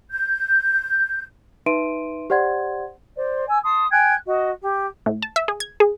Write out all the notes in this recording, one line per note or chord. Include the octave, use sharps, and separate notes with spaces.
G6
D#4 B4 E5 C6 D7 D#7
G4 C5 D5 F#5 C6 G#6
C5 D5
G#5 E6
A5 C6 D#6
G5 G#5 F#6 G#6
F#4 D#5
G4
A2
A5
E5
G#4
G#6
G#4